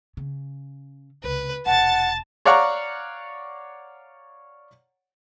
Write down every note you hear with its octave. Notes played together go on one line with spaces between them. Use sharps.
C#3
C#2 C3 B4
E1 C3 F#5 A5 A6
C#5 D5 F5 F#5 A#5 C#6